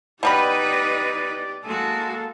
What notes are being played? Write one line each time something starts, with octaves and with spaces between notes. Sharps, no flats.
B2 G3 D#4 G4 B4 D5 B5
G#3 A#3 F#4 A4